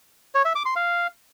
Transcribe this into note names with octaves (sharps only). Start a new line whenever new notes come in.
C#5
E5
D6
C6
F5